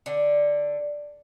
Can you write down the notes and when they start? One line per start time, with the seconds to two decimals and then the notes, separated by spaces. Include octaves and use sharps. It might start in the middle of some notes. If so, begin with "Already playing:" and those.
0.06 D3